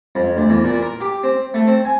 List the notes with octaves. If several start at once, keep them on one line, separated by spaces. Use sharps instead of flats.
F2
D2
E2
A#2
A#4
G4
C4
A3
C4
G#5